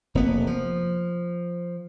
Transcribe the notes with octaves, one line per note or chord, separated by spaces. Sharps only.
F1 A#3 B3
F3